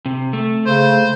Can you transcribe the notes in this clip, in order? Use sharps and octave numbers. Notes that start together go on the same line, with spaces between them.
C3
A3
C#3 C5